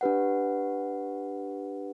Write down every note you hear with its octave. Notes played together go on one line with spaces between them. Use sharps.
D4 G4 B4 F#5